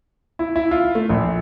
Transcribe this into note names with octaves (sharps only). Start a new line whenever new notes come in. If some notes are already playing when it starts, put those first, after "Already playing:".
E4
E4
F4
A3
A#1